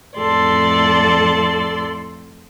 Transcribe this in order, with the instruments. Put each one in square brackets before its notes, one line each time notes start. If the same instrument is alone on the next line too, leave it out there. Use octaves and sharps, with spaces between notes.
[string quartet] F2 A2 A4 D5 C6